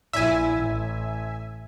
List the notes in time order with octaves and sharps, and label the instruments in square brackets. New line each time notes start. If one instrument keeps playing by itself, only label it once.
[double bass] A#1 E4 [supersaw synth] E5 G#5
[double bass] A1